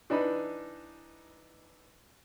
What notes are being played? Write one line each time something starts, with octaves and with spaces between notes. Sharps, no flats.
E3 D4 D#4 B5